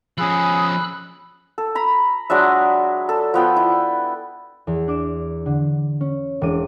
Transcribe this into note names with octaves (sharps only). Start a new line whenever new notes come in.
F3 C#4 G#4 B5 E6 F#6
A4
A#5 B5
F#3 G#3 D4 E5
A4
F3 B3 G5
E4
E2
D4 D6 E7
D3
C#4
E1 D6 D#7